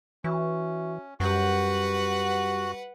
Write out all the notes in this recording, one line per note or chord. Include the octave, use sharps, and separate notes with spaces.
E3 C#4 F#4 E5 C#6
F#2 G3 F#4 G4 B4 F#5